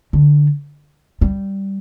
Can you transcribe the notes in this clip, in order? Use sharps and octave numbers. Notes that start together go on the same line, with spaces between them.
D3
G3